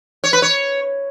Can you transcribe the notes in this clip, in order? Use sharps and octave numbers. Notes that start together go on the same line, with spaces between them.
C#5
B4
C#5